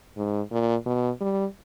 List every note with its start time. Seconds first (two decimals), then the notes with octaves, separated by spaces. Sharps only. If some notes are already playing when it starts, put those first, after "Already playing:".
0.17 G#2
0.51 A#2
0.86 B2
1.21 G3